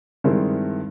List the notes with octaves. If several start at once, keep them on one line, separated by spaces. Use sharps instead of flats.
G2 D#3 G#3 C4 E4